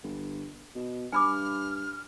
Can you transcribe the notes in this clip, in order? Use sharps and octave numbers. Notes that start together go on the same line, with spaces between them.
G1
B2
G2 G#5 B5 D6 F6